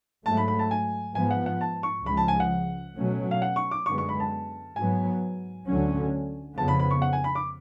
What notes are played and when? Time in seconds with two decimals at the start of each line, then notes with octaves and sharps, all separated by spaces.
0.25 G#2 F#3 A3 A5
0.37 B5
0.48 B5
0.59 A5
0.71 G#5
1.15 G#2 F3 B3 G#5
1.31 F#5
1.46 F#5
1.61 A5
1.83 C#6
2.05 C#2 C#3 F3 G#3 B5
2.17 A5
2.28 G#5
2.40 F#5
2.97 B2 F#3 A3 C#4
3.31 F5
3.42 F#5
3.56 C#6
3.71 D6
3.86 F#2 D3 G#3 B3 C#6
3.98 C#6
4.09 B5
4.20 A5
4.76 G#2 F#3 B3 G#5
5.67 D2 D3 F#3 C#4
6.57 F2 C#3 F3 B3 A5
6.68 B5
6.80 B5
6.91 C#6
7.02 F#5
7.13 G#5
7.24 B5
7.35 D6